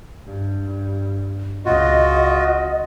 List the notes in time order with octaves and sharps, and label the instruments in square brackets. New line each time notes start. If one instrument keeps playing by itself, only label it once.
[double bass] G2
[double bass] C#2 [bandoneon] F4 F#4 [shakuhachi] D#5